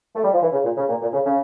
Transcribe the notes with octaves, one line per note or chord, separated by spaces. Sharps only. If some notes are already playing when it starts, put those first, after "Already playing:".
A3
G3
F3
E3
C#3
A#2
C#3
A#2
A#2
C#3
C#3